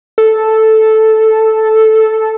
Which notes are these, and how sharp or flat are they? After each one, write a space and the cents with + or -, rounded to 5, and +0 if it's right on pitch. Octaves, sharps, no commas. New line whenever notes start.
A4 -5